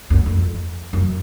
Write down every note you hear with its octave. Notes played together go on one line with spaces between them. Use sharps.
F#2
F2
F#2